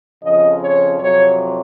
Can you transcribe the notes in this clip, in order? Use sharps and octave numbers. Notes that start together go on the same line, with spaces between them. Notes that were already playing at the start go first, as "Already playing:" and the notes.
F2 C#3 F3 D#5
C#5
F2 C3 F#3 C#5